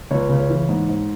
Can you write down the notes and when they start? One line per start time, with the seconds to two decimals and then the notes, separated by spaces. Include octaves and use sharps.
0.11 C#2 C#5
0.29 C#3
0.39 C#5
0.49 E3
0.69 G#2
0.89 G#2